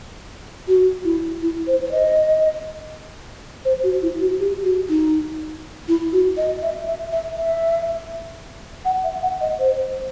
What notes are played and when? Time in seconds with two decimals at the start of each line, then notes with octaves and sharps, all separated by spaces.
0.68 F#4
1.05 E4
1.42 E4
1.67 C5
1.85 C5
1.92 D#5
3.65 C5
3.83 F#4
4.02 E4
4.21 F#4
4.40 G4
4.64 F#4
4.89 D#4
5.88 E4
6.12 F#4
6.37 D#5
6.63 E5
6.87 E5
7.12 E5
7.37 E5
8.85 F#5
9.04 E5
9.22 F#5
9.41 D#5
9.59 C5